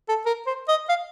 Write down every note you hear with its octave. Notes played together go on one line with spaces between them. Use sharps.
A4
A#4
C5
D#5
F5